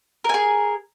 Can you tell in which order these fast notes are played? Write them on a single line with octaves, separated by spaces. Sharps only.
A#4 G#5 G#4